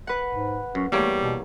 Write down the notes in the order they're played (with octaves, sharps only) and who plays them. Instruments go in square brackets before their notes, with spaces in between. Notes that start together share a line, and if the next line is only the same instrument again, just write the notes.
[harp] B4 F#5
[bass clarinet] G#2
[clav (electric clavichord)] F#2 [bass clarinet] C#4
[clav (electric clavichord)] E2 A#3 C#5 [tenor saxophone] G3 [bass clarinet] A3
[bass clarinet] B2